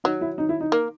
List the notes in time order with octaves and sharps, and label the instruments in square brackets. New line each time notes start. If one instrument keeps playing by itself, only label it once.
[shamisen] F#3 [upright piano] D#4
[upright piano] E4
D#4
E4
D#4
[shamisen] A#3